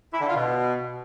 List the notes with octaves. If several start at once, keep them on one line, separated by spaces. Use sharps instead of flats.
E4
D3
F4
B2